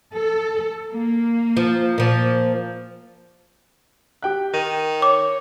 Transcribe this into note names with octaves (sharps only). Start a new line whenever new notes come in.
A4
A#3
F3
A#2 F3
G4 G5 F#6
D#3 D#7
C#5 D6